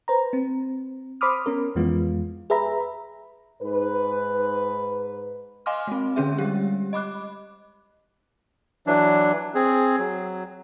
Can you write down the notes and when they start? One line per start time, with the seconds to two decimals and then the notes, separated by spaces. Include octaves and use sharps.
0.08 B4 C5 A#5
0.33 C4
1.21 C5 B5 C6 D6 D#6 F6
1.46 B3 C#4 A#4
1.75 F2 E3 G#3 B3 F4
2.50 G#4 B4 E5 A#5 B5
3.62 G#2 B4
5.66 D#5 F5 G#5 C6 D6 F6
5.87 G#3 C4
6.16 D3 G#3 C#4 G#4 E5
6.38 G3 G#3 G4
6.93 D#5 B5 D6 F#6
8.87 E3 F#3 D4
9.55 C4 G#4
9.99 F#3